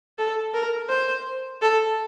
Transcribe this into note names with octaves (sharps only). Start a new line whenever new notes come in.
A4
A#4
C5
A4